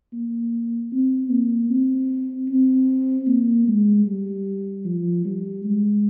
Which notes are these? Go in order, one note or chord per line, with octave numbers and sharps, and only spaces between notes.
A#3
C4
A#3
C4
C4
A#3
G#3
G3
F3
G3
G#3